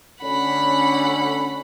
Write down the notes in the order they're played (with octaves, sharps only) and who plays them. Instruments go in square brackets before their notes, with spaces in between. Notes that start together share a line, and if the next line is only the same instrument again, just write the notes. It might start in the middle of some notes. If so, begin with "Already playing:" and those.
[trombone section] D2 D3 C#4 [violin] F#5 B5